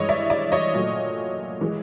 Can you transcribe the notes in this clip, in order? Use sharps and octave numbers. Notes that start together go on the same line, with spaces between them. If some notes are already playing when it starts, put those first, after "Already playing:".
Already playing: G2 E3 G#3 C#5 D#5
D5 E5
D5 E5
C#5 D#5
A#2 F#3 A3
E3 G#3